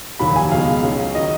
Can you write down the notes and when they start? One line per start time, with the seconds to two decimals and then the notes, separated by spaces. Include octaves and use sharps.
0.19 F1 D#2 D#3 F#3 B5
0.36 G#5
0.52 C#2 B2 G#3 D#4 F5
0.83 C#2 C#3 F#3 C#4
1.14 D#3 D#5